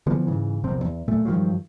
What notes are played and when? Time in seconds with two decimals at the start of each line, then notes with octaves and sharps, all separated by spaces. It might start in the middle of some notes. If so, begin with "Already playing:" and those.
0.07 D3 E3 F3 B3
0.27 G#2 C#3 E3
0.64 A#1 E2 C3 C4
0.82 E2
1.08 B1 A#2 A3
1.25 G2 D#3 F3 F#3